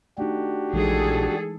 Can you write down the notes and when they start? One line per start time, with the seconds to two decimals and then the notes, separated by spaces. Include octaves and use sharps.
0.18 A3 D4 D#4 F#4 G4
0.73 A#1 E3 G#3 D#4 G#4 A4